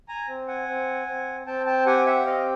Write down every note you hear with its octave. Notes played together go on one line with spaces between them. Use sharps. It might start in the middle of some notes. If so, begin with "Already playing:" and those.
G#5 A#5
C4
F#5 G#5
C4
C4
C4 G5 A5
G5 A5
G4 F#5 G#5
E5 F#5
C4 D#5 F5